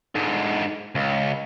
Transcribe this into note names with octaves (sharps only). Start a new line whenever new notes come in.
G#2 D3
C#2